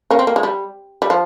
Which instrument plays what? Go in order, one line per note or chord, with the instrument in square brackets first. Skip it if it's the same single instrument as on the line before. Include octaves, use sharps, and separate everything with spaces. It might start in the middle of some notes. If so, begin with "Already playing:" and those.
[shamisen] A#3 C#4
C4
A#3
G#3
G3
G3
F3